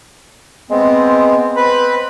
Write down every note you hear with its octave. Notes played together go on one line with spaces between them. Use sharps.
G#3 B3 C4
C4 B4 B5